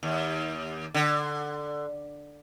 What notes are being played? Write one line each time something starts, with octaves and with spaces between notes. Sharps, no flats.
D#2
D3